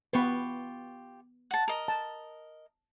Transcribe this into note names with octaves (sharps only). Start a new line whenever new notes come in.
B3 F4 G4 B4 C#6
F#5 A5
A#4 D#5
A5